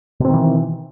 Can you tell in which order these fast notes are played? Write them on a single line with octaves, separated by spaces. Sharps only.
B2 C4 D#3 E3